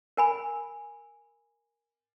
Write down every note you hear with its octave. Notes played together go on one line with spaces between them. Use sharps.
A#4 G#5 B5